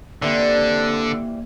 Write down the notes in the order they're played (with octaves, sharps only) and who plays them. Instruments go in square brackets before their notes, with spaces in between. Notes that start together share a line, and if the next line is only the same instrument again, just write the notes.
[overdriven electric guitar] D3 [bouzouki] E3 G3 C4 [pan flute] A#3